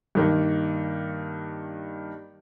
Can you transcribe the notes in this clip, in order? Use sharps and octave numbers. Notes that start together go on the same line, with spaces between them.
G2 D#3 A#3